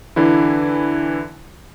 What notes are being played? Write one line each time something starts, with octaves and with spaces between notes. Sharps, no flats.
D3 E3 E4